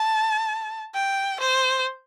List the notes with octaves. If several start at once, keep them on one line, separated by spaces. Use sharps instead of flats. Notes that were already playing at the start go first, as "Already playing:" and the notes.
Already playing: A5
G5
C5